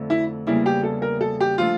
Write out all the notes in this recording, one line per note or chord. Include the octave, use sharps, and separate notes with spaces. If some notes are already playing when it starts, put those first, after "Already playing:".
Already playing: F2 D3 A3
E4
E2 C#3 G3 A#3 E4
G4
A4
A#4
A4
G4
F3 A3 D4 F4